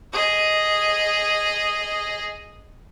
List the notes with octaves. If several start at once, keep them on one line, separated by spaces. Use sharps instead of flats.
G#4 D#5